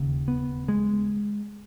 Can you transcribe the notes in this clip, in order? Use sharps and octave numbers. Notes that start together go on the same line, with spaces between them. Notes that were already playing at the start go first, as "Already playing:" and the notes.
Already playing: E1 D#2 C#3
B3
G#3